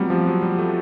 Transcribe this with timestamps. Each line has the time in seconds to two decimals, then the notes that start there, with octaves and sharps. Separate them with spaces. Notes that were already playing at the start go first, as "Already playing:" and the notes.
Already playing: F#3 G3 A3 B3 C4 F4
0.10 F3
0.27 F#3
0.43 G3
0.58 A3